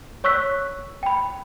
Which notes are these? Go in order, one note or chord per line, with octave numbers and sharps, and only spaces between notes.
C#5 C#6 E6 F#6 B6
G5 B5